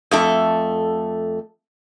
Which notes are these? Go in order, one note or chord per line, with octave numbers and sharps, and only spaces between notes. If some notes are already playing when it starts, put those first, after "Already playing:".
F2 A3 A4